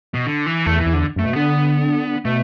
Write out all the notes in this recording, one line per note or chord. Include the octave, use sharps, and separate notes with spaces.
B2
D3
E3
E2 A3
E3
E2
D3
F#2 A3
B2
D3 B3
B2 A3